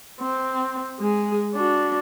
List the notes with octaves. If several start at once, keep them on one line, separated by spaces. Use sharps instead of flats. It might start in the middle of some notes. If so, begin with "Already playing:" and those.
C4
G#3 G#4
D4 F#4